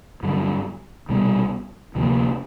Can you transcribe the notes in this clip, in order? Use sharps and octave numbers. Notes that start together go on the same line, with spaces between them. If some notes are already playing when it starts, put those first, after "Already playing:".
G2 D3 F#3
C2 B2 G3 B3
D2 C3 F3 A#3